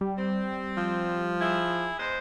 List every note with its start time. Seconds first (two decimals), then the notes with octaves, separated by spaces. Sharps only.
0.01 G3
0.19 C4
0.77 F3
1.40 E4 G#4
1.99 E2 G#3 C5